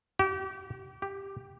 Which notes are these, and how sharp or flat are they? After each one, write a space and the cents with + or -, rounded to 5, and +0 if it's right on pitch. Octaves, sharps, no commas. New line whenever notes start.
G4 -35
G4 +5